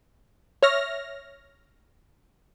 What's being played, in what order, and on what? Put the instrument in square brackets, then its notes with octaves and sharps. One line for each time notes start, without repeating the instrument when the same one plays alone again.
[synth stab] C#5 E5 F6 A#6